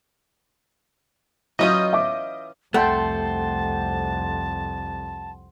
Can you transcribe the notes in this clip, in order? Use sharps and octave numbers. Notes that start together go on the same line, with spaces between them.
E3 F#3 C#4 F4 D#5 D#6 G6
E5 D6
C2 F2 A3 F#5 G5 A5 C6